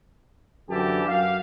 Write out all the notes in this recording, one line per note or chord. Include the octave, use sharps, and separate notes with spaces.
F#2 D3 E3 G4 A5
F#2 F#4 F5